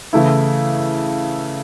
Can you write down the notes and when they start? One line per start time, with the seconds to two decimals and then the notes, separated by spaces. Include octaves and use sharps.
0.13 C#3 E3 A3 E4